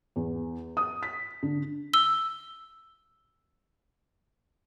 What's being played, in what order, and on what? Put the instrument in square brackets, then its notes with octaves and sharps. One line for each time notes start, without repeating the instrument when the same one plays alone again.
[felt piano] E2
D#6
B6
D3
[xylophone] E6 G7